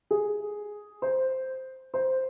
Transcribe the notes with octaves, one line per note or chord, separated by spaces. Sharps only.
G#4
C5
C5